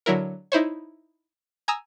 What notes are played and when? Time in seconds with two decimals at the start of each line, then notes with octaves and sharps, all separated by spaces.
0.06 D3 F#3 E4 A#4
0.52 D#4 E4 C5 C#5
1.68 G#5 A#5 D#6 E6